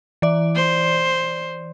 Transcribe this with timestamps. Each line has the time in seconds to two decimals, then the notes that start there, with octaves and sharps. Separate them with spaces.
0.22 E3 D5
0.55 C5